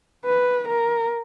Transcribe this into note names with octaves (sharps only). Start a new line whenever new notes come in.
B4
A#4